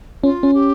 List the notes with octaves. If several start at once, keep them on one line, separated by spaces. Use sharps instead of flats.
C#4 F4
C#4
G4